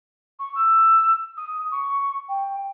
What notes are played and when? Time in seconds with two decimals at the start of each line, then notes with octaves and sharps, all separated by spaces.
0.39 C#6
0.56 E6
1.37 D#6
1.72 C#6
2.29 G5